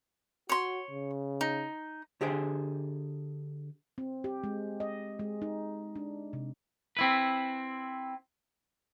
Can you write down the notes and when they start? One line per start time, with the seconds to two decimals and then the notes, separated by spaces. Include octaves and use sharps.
0.49 F#4 C#5 C6
0.91 C#3
1.41 D#4
2.21 D3 G4 G#4 C5 G5
3.98 C4
4.24 G4
4.44 G#3
4.80 D#5
5.19 G#3
5.42 D#4
5.96 D4
6.33 C3
6.97 C4 E4 B4